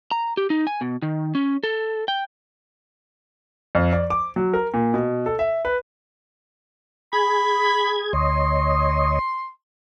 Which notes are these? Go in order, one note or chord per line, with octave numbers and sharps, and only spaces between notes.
A#5
G4
D#4
G#5
B2
D#3
C#4
A4
G5
F2
D5
D6
F#3
A#4
A#2
B2
A4
E5
B4
G#4 B5 G#6
D2 C#5 D#5 C6